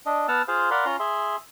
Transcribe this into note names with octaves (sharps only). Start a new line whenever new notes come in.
D4 D#5
B3 F#5 A5 E6 F6
F4 G#4 C5 F5
A#4 D5 F5 F#5 B5 C6
C#4 F4 A#5 C6
G#4 E5 C6